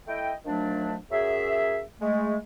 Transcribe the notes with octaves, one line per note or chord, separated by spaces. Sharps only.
A3 E4 D#5 G5
D#3 F3 F#3 A3 D4
F#2 G#4 E5
G#3 A3